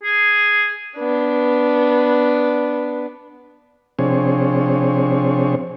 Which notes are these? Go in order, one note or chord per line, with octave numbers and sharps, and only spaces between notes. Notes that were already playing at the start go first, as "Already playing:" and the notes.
G#4
B3 D4
C3 F3 C4 D4 G#4 C#5